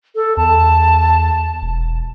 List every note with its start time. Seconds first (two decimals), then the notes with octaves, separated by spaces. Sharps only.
0.15 A4
0.37 E2 A5
1.62 E1